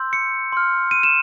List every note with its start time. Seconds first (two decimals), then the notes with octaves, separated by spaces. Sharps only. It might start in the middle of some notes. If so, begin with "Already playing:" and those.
Already playing: C6 E6 G6
0.13 C#7
0.52 C6 F6
0.91 D#7
1.03 E7